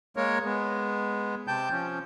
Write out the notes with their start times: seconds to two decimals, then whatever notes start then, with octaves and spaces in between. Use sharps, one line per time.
0.16 G#3 A#3 A#4 C#5
0.45 G#3 B3
1.48 C3 G5 A5 G6
1.71 F3 C#4